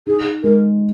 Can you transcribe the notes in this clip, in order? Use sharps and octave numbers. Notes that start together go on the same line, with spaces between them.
D#4 G#4
G#3 A#4